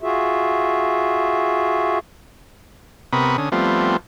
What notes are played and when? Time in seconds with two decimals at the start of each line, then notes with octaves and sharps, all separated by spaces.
0.01 F4 F#4 G#4 E5
3.13 C3 B3 A#4 B5 C#6 D#6
3.38 D3 C#4 D#6
3.52 F3 G3 A3 B3 C4 F4